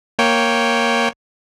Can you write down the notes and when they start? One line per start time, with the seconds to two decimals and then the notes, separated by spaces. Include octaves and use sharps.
0.19 A#3 C#5 G5